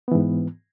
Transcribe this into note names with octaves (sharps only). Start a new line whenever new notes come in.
G#2 E3 B3